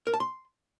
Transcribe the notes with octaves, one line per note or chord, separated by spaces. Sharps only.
A#4
A5
C6